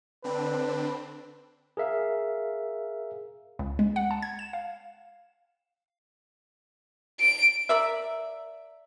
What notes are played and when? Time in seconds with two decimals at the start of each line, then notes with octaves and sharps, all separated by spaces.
0.24 D3 C4 D4 B4
1.77 G#4 A#4 E5 F5
3.59 C#2
3.79 G#3
3.96 F#5
4.11 A5
4.22 G#6
4.39 E7
4.53 F5
7.20 D7
7.69 A#4 D5 E5